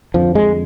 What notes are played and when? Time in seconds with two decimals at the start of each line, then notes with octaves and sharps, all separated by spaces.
0.14 F2 D3 F3
0.35 G#3